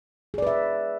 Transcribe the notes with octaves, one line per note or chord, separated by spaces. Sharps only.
G#4 B4 D5 E5